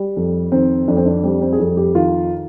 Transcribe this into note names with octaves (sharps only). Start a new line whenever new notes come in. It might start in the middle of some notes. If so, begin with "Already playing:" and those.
Already playing: G3
F2
D#3 C4
F2 D4
C4
D4
G3 C4
C4
G#4
F2 G4
G4
D#3 F4